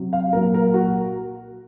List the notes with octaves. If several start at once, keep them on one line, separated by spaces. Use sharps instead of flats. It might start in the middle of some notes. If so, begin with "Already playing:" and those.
Already playing: C3 F#3
F5
A#2 F#3 A#4
A#4
F#4